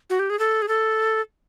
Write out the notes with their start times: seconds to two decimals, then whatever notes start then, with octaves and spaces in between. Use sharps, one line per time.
0.10 F#4
0.19 G4
0.30 G#4
0.39 A4
0.62 G#4
0.68 A4